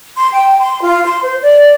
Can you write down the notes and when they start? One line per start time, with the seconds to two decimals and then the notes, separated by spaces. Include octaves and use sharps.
0.17 C6
0.33 G5
0.59 C6
0.83 F4
1.05 C6
1.22 C5
1.42 D5